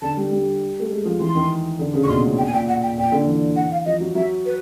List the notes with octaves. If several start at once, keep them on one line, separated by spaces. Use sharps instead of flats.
D3 A5
G3
G3
A3
G#3
F3
E3 C6
D#3
D3
C#3
A#2 C#6
B2 C6
A2
A#2 G5
G#5
A#2 G5
F#5
G5
A#2 G5
D3
E3
F#5
F5
F3 D#5
F#3
F#3 E5
B4